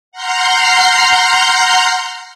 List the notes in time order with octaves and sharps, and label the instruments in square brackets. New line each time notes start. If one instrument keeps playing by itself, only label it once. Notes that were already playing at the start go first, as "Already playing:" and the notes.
[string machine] F#5 A#5 C6 F6 G6 C7